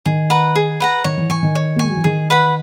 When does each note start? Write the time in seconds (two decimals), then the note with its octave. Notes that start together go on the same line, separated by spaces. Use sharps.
0.06 D#3 G#4
0.30 B4 F#5 A#5
0.55 G#4
0.80 B4 F#5 A#5
1.04 D#3 C#5
1.17 E3
1.29 E3 G#5 C#6
1.43 D#3
1.55 C#5
1.76 A#3
1.79 G#3 G#5 C#6
1.90 F#3
1.97 E3
2.04 D#3 G#4
2.30 B4 F#5 B5